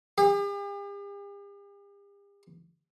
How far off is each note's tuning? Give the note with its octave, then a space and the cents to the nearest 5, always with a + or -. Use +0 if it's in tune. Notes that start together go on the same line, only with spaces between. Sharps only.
G4 +45